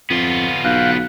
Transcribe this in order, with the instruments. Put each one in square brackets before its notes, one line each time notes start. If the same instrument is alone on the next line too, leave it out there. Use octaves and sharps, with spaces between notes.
[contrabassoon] F2 [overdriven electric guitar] B3 F4
[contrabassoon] B1 [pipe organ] F5 G5 F#6